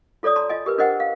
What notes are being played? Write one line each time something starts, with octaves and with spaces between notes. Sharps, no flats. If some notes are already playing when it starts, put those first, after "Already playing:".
F4 A4 C#5 D5 D#6
A5 A#5 C6
F4 D#5 G#5
G4 A#4 B4
D4 A#4 C5 D#5 F#5 G5
F5